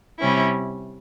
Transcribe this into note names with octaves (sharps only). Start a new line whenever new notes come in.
C3 G3 C#4 E4